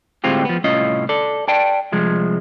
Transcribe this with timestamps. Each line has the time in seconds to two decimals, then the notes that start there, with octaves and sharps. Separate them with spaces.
0.24 D2 A2 G#3 C4 F4 G4
0.45 F3 B3
0.64 C2 A2 C#4 F4 D#5
1.09 A4 D5
1.48 D5 G5 A5
1.92 C2 F3 G#3